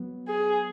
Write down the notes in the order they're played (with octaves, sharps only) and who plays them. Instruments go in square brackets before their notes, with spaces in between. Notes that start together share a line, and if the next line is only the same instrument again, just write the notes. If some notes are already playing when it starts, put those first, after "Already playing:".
Already playing: [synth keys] F#3 B3
[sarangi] G#4